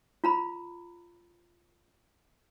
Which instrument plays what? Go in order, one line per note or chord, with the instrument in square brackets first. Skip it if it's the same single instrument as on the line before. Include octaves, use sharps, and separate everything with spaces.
[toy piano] F4 A#5 B5